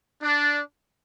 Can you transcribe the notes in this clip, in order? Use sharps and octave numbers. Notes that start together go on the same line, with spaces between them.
D4